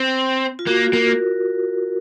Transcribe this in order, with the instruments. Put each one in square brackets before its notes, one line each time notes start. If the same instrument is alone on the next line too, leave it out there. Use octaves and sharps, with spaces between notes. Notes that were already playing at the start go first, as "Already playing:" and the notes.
Already playing: [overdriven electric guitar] C4
[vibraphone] F4
[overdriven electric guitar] A#3 [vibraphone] F#4
[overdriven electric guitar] A#3 [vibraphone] A#4